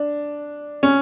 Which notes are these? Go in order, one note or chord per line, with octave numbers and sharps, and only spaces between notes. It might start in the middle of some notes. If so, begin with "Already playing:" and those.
Already playing: D4
C#4